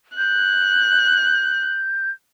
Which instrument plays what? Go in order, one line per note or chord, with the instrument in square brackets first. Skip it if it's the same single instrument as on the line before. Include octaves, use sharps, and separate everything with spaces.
[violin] F#6 [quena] G6